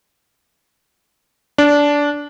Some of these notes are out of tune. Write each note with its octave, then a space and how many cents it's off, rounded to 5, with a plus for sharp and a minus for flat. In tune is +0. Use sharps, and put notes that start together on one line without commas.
D4 -15